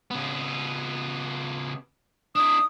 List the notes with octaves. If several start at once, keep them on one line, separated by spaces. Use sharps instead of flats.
C#3 B3
D4 E4 D#6